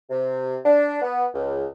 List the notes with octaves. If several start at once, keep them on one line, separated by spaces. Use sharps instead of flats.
C3
D4
B3
C#2